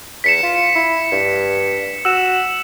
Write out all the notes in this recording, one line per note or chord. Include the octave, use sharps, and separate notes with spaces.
E2 B6 C#7 E7
F4
E4
G2
F#4 E6 E7